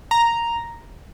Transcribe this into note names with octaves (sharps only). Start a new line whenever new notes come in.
A#5